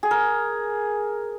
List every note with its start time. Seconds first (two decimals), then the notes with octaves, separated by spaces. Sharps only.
0.03 G#4
0.11 A#4